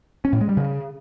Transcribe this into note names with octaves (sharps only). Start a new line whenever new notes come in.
C#4
A2
G#3
G3
C#3